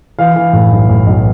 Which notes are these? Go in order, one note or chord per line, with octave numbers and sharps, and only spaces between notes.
E3 F5
E3
A2
B1
A2
B1